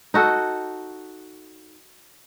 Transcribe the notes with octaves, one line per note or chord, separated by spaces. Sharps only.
D#4 F#4 A4